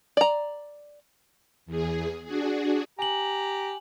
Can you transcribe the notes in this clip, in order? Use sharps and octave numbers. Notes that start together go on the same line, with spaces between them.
D5 A#5
E2 G#4
D4 F#4 G#4
G4 G#5 A#5 F#7